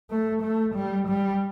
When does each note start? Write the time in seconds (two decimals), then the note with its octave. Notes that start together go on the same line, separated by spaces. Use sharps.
0.10 A3
0.43 A3
0.76 G3
1.08 G3